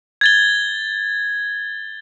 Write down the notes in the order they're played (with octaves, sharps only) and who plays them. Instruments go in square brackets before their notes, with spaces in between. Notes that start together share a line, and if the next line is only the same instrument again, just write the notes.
[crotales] G#6 A6 G7